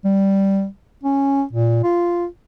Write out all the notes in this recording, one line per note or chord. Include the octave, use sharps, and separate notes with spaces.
G3
C#4
A#2
F4